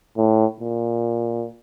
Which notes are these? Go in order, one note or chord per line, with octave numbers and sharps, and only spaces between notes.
A2
A#2